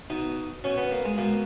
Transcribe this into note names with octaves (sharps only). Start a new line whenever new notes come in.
B2 D#4
B2 C#4
B3
A#3
G#3
B2 A#3